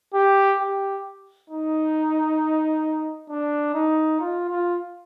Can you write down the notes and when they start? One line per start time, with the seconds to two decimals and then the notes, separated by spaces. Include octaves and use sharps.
0.14 G4
0.60 G4
1.50 D#4
3.30 D4
3.74 D#4
4.20 F4
4.50 F4